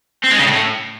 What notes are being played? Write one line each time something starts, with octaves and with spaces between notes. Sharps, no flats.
C4
G#3
C#3
A2